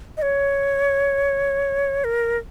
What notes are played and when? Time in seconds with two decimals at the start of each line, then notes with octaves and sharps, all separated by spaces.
0.17 D#5
0.22 C#5
2.04 A#4